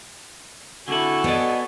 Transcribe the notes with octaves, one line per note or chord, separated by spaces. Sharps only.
D3 C4 E4 F#4 A4 G#5
B3 C5 D5 D#5